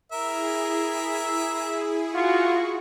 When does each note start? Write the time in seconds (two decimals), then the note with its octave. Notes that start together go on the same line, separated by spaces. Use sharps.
0.12 E4 G#4 A#4 E5
2.14 F4 F#4 C#6